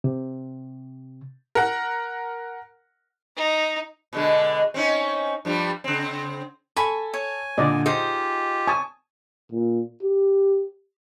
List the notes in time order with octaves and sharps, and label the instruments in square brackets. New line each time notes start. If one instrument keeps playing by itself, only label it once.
[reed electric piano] C3
[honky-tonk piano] A#4 F#5
[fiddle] D#4
[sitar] B2 D3 G#3
C4 C#4 D#4
G2 F3 G3
C#3 C4
[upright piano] A4 [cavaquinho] G#5 B5 C#6
[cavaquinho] C#5 [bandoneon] G#5
[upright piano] A#2 D3 [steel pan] D5 D#5
[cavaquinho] D#4 C5 [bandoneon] F4 G4 [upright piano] G#4
[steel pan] G#5 A5 [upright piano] C#6 D#6
[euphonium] A#2
G4